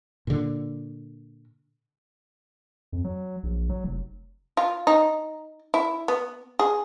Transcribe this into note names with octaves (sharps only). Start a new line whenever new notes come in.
A#2 D3
F2
F#3
A#1
F#3
F1
F4
D#4
E4
B3
G#4